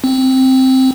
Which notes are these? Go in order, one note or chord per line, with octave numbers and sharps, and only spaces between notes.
C4